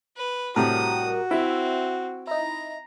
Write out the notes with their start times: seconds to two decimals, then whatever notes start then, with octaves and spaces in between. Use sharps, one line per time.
0.17 B4
0.56 A2 C3 G3 F#4 G4 A#4 D#6
1.31 C4 E4 E5
2.27 D#4 E4 A#5